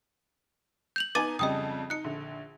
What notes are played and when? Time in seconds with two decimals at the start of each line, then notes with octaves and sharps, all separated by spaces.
0.96 G6 F7 F#7
1.15 B3 D#4 G#5 D6 A6 D#7
1.39 F2 C#3 G3 D#5 G5 D#6
1.90 D#4 F#6 C#7
2.04 A#1 D3